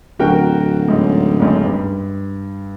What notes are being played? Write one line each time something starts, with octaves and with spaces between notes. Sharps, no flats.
D1 F#4 A#4 G5
A1 G#2
F#1 G#2
G2